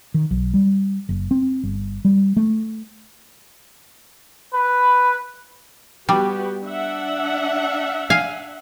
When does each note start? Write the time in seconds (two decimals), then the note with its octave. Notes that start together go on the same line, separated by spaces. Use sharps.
0.14 D#3
0.31 B1
0.54 G3
1.09 F#1
1.31 C4
1.63 G1
2.05 G3
2.37 A3
4.54 B4
6.09 G3 B3 F#4 G4
6.65 D4 E5 F#5
8.10 F5 G#5